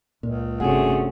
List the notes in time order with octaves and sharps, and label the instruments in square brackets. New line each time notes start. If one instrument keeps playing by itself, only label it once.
[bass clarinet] C#2 [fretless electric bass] A#2
[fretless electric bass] G1 [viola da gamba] C3 A3 C#4 [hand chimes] D4 F#4 F#5 [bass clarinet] G#4